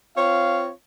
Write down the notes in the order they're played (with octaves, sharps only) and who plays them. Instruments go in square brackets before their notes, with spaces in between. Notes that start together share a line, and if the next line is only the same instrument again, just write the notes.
[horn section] C4 F4 C#5 F5